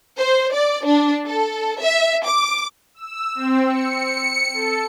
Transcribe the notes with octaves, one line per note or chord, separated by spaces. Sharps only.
C5
D5
D4
A4
E5
D6
E6
C4
C#7
A4